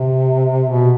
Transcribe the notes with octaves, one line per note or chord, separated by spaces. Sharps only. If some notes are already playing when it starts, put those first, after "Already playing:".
Already playing: C3
B2